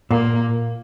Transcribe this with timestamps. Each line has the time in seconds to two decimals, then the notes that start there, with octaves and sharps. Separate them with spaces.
0.11 A#2 A#3